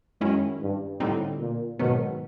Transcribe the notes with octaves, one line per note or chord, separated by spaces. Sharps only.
F#2 D#3 G#3 C#4 E4
G2
A2 D3 G3 C4 D#4
A#2
G#2 B2 D#3 F#3 B3